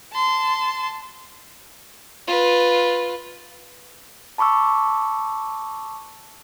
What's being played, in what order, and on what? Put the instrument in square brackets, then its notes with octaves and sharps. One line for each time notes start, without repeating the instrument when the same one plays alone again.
[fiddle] A5 C6
[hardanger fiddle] F4 B4
[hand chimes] A5 B5 C#6 D6 E6